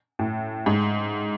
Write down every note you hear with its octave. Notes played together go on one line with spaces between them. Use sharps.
A2
G#2